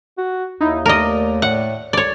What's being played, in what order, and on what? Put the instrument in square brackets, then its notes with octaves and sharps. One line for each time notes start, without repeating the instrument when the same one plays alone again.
[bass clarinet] F#4
[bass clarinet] D#2 [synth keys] D#4 E4
[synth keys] A3 D5 [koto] A#4 D#5
[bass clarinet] A2 [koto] F#5
[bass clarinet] C2 [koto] C#5 D5